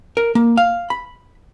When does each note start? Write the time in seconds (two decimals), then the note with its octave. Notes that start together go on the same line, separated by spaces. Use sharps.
0.17 A#4
0.35 A#3
0.57 F5
0.90 B5